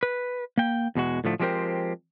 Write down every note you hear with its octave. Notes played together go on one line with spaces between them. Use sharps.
B4
A#3 G5
E2 B2 G#3 F#4
A2 D3 F3 A3
F3 G#3 C4 G4 A#4 C5